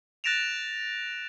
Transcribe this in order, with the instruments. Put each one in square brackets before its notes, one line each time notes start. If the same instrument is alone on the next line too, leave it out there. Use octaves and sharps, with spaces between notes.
[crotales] F#6 A6 A#6 D7 E7 F7